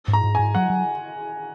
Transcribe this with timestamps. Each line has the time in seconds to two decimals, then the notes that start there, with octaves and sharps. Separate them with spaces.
0.08 G#2
0.13 A#5
0.24 G#2
0.35 G#5
0.39 G#2
0.55 F#3 F#5
0.70 F#3